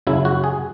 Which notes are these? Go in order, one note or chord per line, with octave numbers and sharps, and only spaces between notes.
F#2 C#3 F#3 E4
F#4
G#4